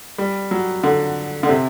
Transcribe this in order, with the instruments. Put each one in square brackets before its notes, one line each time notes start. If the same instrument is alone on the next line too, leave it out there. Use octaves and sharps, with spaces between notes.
[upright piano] G3
F#3
D3
D3
C3